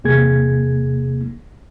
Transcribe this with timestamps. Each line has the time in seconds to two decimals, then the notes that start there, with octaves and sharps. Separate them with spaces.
0.04 E2 C3 A#3 G#4 G#6